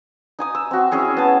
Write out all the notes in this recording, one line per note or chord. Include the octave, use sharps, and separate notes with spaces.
D#4 G#5 D#6
E6
C4 F#4
C#4 E4 G#4 C#5
B3 A5